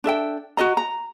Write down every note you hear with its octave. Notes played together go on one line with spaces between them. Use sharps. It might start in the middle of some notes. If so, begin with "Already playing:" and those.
D4 A4 E5 G5
F#4 G#4 D#5 A#5
A#5